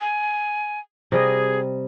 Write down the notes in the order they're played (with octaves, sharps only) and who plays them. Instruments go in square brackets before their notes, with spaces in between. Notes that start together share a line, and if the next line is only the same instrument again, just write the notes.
[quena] G#5
[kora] C3 G3 D#5 [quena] G#4